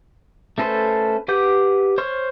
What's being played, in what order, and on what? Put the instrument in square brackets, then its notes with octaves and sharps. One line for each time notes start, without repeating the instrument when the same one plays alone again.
[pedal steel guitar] A3 C#4 A4 B4 C5
G4 B4 F#5 D6 G6
C5 C#5 C6 C#6 F6